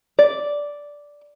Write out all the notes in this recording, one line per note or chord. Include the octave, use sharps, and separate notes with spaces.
D5